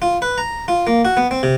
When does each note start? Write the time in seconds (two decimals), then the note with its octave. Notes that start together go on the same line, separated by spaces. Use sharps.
0.02 F4
0.22 B4
0.38 A#5
0.68 F4
0.87 A#3
1.05 F#4
1.17 B3
1.31 C4
1.43 C3